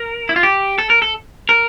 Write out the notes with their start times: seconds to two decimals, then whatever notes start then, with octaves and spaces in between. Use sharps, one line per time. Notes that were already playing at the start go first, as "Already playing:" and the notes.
Already playing: A#4
0.29 E4
0.36 F4
0.43 G4
0.78 A4
0.90 A#4
1.02 A4
1.49 A#4